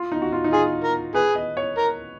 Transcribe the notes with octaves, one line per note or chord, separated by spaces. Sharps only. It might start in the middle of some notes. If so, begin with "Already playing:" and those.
Already playing: F4
D#4
F#4
F4
D#4
F4 G#4
A#4
G#4 B4
D#5
C#5
A#4